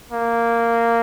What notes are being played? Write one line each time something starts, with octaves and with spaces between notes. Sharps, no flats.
A#3